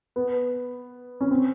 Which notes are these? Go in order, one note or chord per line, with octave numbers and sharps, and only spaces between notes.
B3
C#4
C4